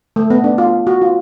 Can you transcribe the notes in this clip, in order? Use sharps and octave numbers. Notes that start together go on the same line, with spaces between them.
A3
B3
D4
F4
F#4
F4